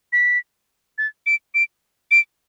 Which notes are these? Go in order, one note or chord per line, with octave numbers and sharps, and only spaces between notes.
B6
A6
D7
D7
D7